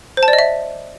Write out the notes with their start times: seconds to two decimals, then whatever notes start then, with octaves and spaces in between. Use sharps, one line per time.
0.17 C5
0.23 A5
0.28 D5
0.33 D#5
0.39 E5